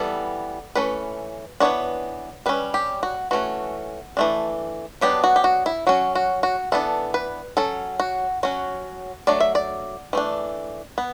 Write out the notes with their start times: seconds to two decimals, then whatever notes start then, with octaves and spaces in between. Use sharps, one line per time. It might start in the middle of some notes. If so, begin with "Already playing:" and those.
Already playing: E3 G3 B3 A4
0.75 E3 A3 C#4 B4
1.60 E3 B3 D4 C#5
2.46 G3 C#4 B4
2.74 G4
3.03 F#4
3.31 E3 A3 C#4 F#4
4.17 E3 A3 D4
5.01 F#3 B3 D4 G4
5.24 F#4
5.36 G4
5.44 F#4
5.66 E4
5.87 F#3 C#4 F#4
6.15 F#4
6.43 F#4
6.72 E3 B3 D4 A4
7.14 B4
7.57 F#3 C#4 A4
8.00 F#4
8.43 F#3 C#4 F#4
9.27 F#3 A3 D4 D5
9.40 E5
9.55 D5
10.13 E3 A3 D4
10.98 B3